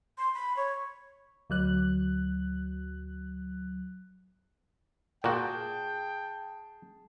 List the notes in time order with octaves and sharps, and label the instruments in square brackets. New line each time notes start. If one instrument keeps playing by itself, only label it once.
[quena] C6
B5
C#5
[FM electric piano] D2 F#3 F#6
[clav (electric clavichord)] A#2 F#4 [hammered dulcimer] G#4 A5 [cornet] G5